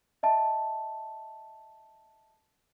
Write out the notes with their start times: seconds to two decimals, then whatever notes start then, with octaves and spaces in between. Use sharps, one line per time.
0.23 D#5 E5 A5